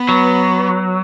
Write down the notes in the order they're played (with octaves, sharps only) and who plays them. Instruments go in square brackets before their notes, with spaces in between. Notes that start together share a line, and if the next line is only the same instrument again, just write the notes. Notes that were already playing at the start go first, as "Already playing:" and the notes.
Already playing: [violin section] B3
[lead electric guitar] F#3